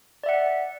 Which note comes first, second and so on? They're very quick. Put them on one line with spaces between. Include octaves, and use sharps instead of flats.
D5 E5 F#5